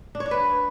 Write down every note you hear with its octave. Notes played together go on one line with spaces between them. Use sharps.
D4
C#5
D4
B4